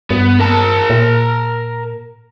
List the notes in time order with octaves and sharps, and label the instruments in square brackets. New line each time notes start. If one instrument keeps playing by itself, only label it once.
[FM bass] G2 [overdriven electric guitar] B3
[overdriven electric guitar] A#4 A5
[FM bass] A#2